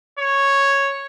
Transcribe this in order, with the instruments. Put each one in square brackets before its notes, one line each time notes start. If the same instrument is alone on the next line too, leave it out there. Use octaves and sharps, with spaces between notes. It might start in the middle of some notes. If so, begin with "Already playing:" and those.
[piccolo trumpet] C#5